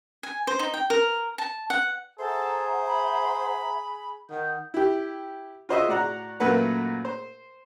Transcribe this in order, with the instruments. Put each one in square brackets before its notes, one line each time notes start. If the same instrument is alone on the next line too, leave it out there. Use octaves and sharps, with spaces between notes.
[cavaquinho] G#5
C5
D#4
G5
A#4
A5
F#5
[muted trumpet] G#4 [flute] A4 [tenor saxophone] C5 [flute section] E5 F#5 A#5
[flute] B5
[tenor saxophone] D#3 [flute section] F#5 D#6 G6
[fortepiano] E4 G4
F4 F#4 C5 C#5 D#5 E5
A2 F#4 D5 F#5 A#5
F#2 A#2 A3 A#3 B4 F#5
C5